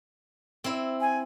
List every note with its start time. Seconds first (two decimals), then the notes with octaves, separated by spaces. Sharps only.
0.64 C4 E4
1.01 G#5